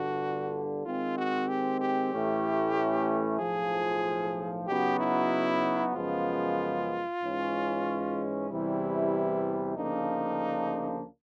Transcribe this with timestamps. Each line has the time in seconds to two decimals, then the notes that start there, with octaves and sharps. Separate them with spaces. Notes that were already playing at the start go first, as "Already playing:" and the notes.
Already playing: G1 G2 D3 F#4
0.85 D#3 G#3 C4 F4
1.18 F#4
1.48 G4
1.81 G4
2.13 A1 A2 E3 A3 C#4
3.40 B1 A2 F3 G#4
4.67 C#3 F#3 B3 D#4 F#4 G4
5.00 E4
5.94 F#2 C#3 F3 G#3 B3 F4
7.22 G#2 E3 G#3 C#4
8.50 E2 C3 E3 G3 E4
9.77 D2 C#3 F3 A#3 D4 D#4